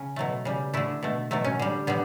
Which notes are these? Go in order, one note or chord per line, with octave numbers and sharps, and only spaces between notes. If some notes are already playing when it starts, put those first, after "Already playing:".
Already playing: C#3 C#4
B2 F#3 A3
C#3 G3
D3 A3 E4
B2 A3
B2 F#3 A3
C#4
D3 G3
D3 G3 B3